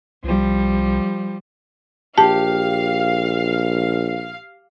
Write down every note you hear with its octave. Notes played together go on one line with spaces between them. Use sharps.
C2 F3 G3
A#1 G4 F5 A5